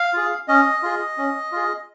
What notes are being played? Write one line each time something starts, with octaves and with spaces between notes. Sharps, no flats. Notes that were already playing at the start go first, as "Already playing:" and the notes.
Already playing: F5
F4 G#4
C#4 D#5
F4 G#4
C#4
F4 G#4